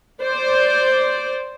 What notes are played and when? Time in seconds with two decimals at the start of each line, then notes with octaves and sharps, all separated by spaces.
0.22 C5 D5